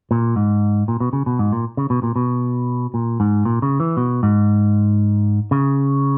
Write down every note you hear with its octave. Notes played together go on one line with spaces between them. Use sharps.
A#2
G#2
A#2
B2
C#3
B2
G#2
A#2
C#3
B2
A#2
B2
A#2
G#2
A#2
C#3
E3
B2
G#2
C#3